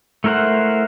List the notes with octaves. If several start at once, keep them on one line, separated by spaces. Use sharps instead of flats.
A3 E4 A#4 C5 F#5